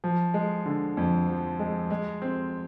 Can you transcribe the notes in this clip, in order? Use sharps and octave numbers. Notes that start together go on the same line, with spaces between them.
F3
G#3
D3
F2
F3
G#3
G#3
C4